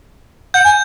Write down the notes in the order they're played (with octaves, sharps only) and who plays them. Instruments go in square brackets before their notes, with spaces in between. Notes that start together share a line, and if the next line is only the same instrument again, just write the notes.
[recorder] F#5 [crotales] G6
[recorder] G#5